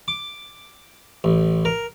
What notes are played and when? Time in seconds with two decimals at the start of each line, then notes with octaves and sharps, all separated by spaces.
0.08 D6
1.24 A1
1.65 A#4